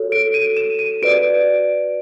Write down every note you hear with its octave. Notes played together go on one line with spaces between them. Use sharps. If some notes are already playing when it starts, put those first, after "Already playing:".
Already playing: F#4 A4 C#5
D7
D#7
E7
D#7
F#4 B4 D5 D7